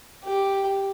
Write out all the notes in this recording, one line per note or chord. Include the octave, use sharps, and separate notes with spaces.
G4